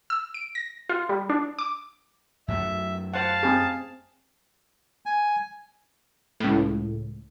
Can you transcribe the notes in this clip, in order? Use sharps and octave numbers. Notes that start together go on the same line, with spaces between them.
E6
D7
A#6
F4
G3
D4
D6
F#2 F#3 A3 E5
C5 F5 F#5 A5
C4 G#4
G#5
C#2 A2